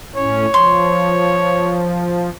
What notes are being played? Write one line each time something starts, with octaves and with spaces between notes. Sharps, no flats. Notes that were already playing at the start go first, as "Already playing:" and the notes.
A2 C#4 C#5
F3 C6